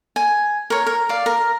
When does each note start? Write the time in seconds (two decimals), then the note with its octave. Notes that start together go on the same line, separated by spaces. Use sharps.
0.16 G#5
0.70 A#4 C#5
0.87 A#4
1.09 D5 F5
1.26 A#4